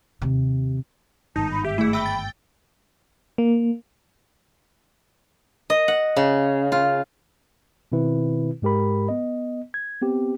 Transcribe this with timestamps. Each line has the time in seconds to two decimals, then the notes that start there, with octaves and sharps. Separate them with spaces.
0.22 D#2 C3
1.36 G1 G#2 D#3 D#4 A5
1.51 B5
1.65 G4 E5
1.78 A3 E4 G#4
1.93 E5 G5 B5 E6
2.06 A6
3.38 A#3
5.70 D#5
5.88 F#5
6.17 C#3
6.72 F4
7.92 B2 D#3 C4 E4 B4
8.62 G#2 G#3 G4 A#4 B5
9.09 B3 D#5
9.74 G#6
10.01 B3 C4 G4